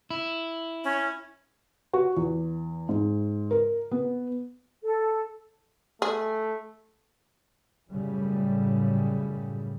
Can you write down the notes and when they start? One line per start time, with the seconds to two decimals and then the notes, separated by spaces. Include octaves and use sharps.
0.10 E4
0.84 C#4
1.93 F#4
2.17 E2
2.89 G#2
3.51 A#4
3.91 B3
4.83 A4
6.02 A3 G#4
7.92 F#2 A2 C#3 G3